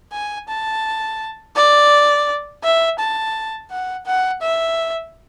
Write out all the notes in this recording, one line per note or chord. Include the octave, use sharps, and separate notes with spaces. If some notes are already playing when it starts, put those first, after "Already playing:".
G#5
A5
D5
E5
A5
F#5
F#5
E5